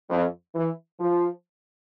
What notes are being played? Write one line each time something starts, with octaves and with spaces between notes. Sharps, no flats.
F2
E3
F3